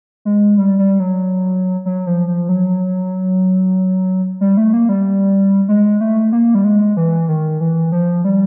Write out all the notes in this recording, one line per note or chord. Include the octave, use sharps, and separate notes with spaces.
G#3
G3
G3
F#3
F#3
F3
F3
F#3
G3
A3
A#3
G3
G#3
A3
A#3
G3
G#3
E3
D#3
E3
F3
G3